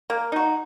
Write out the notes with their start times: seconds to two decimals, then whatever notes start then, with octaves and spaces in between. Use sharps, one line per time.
0.10 A#3
0.32 D#4 F#4